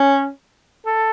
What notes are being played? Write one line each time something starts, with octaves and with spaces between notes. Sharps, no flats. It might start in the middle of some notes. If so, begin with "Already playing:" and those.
Already playing: C#4
A4